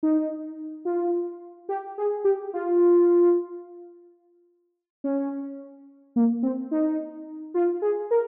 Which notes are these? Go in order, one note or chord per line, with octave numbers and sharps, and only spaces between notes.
D#4
F4
G4
G#4
G4
F4
C#4
A#3
C4
D#4
F4
G#4
A#4